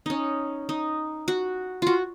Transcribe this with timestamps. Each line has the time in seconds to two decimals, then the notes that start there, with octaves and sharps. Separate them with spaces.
0.06 C#4 D#4
0.69 D#4
1.28 F#4
1.82 F4 F#4